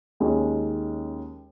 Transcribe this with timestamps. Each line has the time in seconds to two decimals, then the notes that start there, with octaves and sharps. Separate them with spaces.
0.20 D#2 D#3 G#3 C#4